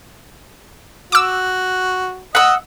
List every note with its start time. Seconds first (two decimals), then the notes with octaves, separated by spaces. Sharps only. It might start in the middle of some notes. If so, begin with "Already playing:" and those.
1.12 F#4 D6 E6
2.35 D#5 F#5 E6